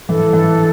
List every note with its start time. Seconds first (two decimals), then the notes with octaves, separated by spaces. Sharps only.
0.09 E3 A4
0.33 E3